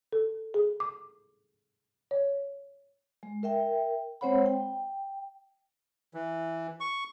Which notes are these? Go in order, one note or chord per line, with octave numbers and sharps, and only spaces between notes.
A4
G#4
D6
C#5
G#3
A#4 E5 G5
G#3 C4 C5 C#5 F#5 B5
G5
E3
C#6